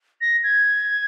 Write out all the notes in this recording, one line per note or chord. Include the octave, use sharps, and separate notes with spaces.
A#6
G#6